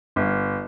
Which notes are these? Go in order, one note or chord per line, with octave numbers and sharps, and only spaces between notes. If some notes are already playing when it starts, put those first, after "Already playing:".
G1